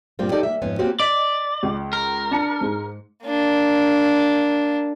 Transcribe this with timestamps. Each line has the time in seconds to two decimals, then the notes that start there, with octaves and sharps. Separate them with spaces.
0.19 G2 A#2 G3 A#3 C4 F4
0.32 D#4 G4 A4 D5
0.43 A#3 E5
0.62 F2 G#2 B3 C#4
0.79 A#3 C4 C#4 F#4 G4
1.00 D5 D#5 B6
1.63 C#2
1.93 A#4
2.31 D4 A5 C#7
2.61 G#2 G#3
3.24 A#3 D4